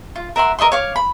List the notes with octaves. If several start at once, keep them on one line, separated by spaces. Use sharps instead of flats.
F4
A#4 E5 F#5 C6
A#4 D#5 E5 C6
C#5 F5 D6
B5